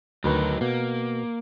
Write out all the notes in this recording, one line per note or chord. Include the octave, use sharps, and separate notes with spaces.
D2 D#3 F#3 D#4 B4
B2 A#3